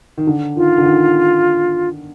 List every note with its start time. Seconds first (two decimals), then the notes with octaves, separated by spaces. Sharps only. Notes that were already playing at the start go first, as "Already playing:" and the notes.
0.18 D#3
0.27 D3
0.56 D#3 F4
0.78 D3
0.85 D#3